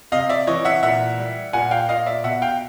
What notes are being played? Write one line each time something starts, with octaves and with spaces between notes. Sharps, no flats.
C3 D#5 F5
D5 E5
E3 C#5 D#5
E5 F#5
A#2 E5 F#5
G3
A#2 F#5 G#5
F5 G5
A#2 D#5 F5
D5 E5
B2 E5 F#5
F5 G5